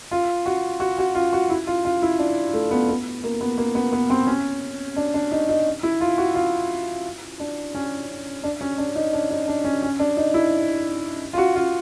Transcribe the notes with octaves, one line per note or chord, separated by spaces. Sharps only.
F4
F#4
F#4
F#4
F4
F#4
E4
F4
F4
E4
D4
A3
B3
B3
A#3
B3
A#3
B3
B3
C4
C#4
D4
D4
D#4
D#4
E4
F4
F#4
F4
D4
C#4
D4
C#4
D4
D#4
D4
D#4
D4
C#4
C#4
D4
D#4
E4
F4
F#4
F4